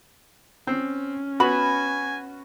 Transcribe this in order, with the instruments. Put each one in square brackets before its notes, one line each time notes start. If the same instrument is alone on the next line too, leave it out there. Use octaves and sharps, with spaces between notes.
[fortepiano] C4 [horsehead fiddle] C#4
[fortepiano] B3 F#4 [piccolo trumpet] G#5 [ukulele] B5